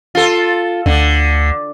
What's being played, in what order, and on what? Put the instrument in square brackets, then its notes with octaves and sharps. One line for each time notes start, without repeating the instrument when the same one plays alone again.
[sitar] F4 A4
[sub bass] D2 [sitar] D3